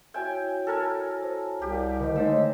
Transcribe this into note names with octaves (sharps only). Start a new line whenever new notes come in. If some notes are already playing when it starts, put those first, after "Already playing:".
E4 F#4 C#5 E5 G5 G#5
A4 A#4 G#5
C5
C2 G4
D3 D#3 C5 D#5
G#3 A3 D#4 C#5 E6